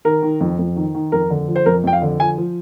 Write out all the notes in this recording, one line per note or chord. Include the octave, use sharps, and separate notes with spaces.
D#3 A#4
D#3
F2
F2
D#3
D#3
F2 A#4
D3
F3
C5
F2 A#4
F2 G5
F5
D3
F3 G#5
F3